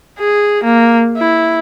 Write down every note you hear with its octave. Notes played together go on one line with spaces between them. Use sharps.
G#4
A#3
E4